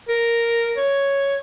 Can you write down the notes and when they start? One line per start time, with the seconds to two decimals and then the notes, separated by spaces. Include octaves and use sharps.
0.09 A#4
0.77 C#5